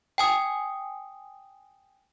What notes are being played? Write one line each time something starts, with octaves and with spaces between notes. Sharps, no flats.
G5 G#5 D#6